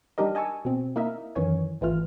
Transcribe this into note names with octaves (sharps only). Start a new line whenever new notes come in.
G3 D4 D#4 G4 A#4 D#5
D#5 G#5 A5 C#6 E6
B2 C4
A#3 D#4 E4 A#4 D#5 E5
F#2 D#3 E3 C#5 G#5
G#1 E3 A3 F4 F6